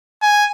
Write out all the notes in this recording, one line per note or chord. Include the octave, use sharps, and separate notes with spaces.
G#5